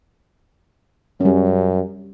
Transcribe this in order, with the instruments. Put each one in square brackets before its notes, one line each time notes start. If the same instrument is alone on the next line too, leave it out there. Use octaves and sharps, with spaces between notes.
[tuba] F#2 [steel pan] G3 C#4